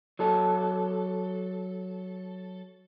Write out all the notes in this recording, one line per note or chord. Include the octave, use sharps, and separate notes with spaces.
F#3 A4